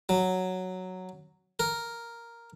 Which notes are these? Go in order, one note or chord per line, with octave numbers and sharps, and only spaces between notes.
F#3
A#4